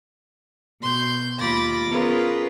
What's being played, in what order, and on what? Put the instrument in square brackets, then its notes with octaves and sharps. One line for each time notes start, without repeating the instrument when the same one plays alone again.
[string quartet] B2 C6 G6
D#2 F4 B5 D6 A6 A#6
B3 C#4 F4 G#4 A#4 B4